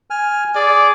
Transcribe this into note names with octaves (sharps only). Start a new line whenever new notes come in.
G#5 F6
G#4 D5 G#5